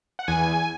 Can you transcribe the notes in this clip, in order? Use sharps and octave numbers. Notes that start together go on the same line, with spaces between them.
F#5
E2 G#5